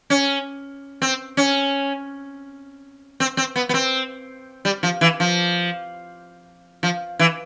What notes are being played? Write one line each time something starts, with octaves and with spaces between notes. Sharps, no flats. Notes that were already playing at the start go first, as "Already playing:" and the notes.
C#4
C4
C#4
C4
C4
B3
B3
C4
G3
F3
E3
F3
F3
E3